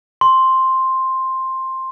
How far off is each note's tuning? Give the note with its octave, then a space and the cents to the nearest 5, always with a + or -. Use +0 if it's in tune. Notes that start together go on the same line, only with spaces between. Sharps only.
C6 +5